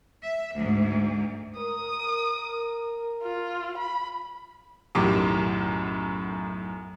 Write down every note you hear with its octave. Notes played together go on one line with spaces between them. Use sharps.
E5
D2 G#2
A#4 D#6
F4
B5
B1 F#2 A2 D#3 G4 D6